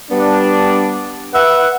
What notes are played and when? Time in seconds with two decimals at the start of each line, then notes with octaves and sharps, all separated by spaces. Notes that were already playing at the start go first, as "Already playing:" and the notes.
0.11 G3 B3 D4
1.34 B4 E5 F#5